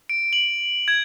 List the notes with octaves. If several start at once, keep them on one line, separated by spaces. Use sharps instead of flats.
D7
F#7
G#6